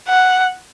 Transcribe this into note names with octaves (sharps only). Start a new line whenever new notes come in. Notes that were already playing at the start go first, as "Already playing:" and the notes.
F#5